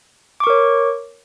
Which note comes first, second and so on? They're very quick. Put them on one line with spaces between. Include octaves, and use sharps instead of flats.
D6 C#6 A#4 C#5